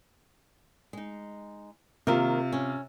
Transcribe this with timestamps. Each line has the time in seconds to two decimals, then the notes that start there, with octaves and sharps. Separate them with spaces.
0.93 G#3 D#4
2.07 C3 D#3 A#3 F4 A#4
2.52 C#4